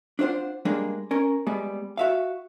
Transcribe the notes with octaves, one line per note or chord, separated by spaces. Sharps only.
D4 F4 C5 F#5
G3 G#3 A#3 D4 G#4
C#4 A#4
G3 G#3 B3
F#4 E5 F5